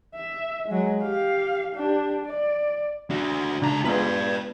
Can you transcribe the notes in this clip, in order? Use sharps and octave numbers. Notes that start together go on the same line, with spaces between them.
E5
F#3 G#3
G4 F5
D4 G4
D5
D4 F#4
C#2 D4 A#5
G#3 B3 F4 B4 D5